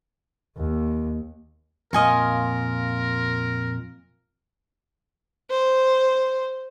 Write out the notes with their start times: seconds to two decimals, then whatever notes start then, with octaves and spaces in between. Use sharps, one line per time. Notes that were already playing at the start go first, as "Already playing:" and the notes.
0.57 D#2
1.93 F2 A#2 F4 A#4 D#5 G#5 C#6
5.51 C5